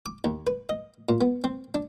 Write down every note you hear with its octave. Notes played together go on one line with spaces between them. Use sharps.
D6
D#2
B4
D#5
A#2
B3
C4
D4